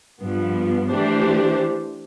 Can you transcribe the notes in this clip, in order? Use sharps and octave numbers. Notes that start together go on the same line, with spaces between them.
G2 F3 B3
E3 A3 D4 G4 C5